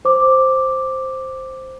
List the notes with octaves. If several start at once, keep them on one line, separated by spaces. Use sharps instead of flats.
C5 D6